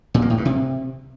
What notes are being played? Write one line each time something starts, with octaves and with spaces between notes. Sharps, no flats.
A#2
A#3
A2
G2
C3